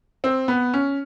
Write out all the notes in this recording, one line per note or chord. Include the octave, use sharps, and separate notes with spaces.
C4
B3
C#4